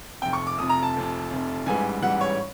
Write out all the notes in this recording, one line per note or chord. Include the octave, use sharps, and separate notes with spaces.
F1 F2 C3 G5
C#6
D6
F1 F2 C3 D#6
A#5
A5
F1 F2 C3
F1 F2 C3
A1 G#2 E3 G3 G#5
A1 G#2 E3 G3 F#5
C#5